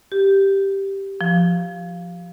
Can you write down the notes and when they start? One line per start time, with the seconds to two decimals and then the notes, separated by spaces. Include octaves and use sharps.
0.12 G4
1.21 F3